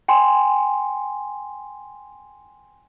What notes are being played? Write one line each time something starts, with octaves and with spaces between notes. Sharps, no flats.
G5 G#5 C6